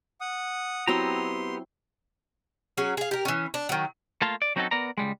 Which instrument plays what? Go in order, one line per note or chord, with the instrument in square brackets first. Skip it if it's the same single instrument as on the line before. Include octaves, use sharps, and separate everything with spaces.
[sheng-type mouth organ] F#5 D#6
[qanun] F#3 C4 E4 [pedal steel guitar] B3 G4 A#5 [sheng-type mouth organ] C6
[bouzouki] F#3 C#4 G#4
G#4 F5
G4 A#4
E3 C#4
D4
D#3 F#3
[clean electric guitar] A3 A#3 F4 A5
D5
F#3 C4 C#4 D#4 F#4 A4
B3 A#4 D5 A#5
C#2 G3 G#3